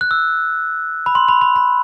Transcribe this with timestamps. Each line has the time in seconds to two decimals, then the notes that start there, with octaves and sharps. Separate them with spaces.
0.01 F#6
0.11 E6
1.06 B5
1.15 C6
1.28 B5
1.41 B5
1.56 B5